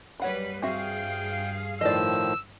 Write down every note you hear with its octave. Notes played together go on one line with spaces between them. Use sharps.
F#2 G3 B4 C#5 F#5 B5
G2 C4 F#4 G#4 E5 F5 G5
A2 D#3 F3 D5 D#5 E6